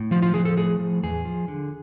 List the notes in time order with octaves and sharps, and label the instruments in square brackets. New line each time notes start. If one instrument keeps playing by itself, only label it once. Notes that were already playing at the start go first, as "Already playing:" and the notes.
Already playing: [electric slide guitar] A2
F3 F4
F4
F3 G#4
A4
A2 G#4
F3
E2 G#4
F3
D3